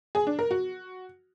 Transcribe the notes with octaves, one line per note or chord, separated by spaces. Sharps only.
G#4
D4
A#4
F#4